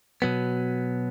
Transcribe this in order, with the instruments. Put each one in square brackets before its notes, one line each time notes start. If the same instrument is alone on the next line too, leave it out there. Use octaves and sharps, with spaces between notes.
[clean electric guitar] B2 F#3 B3